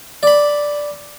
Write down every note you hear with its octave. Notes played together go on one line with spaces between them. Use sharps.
D5 B5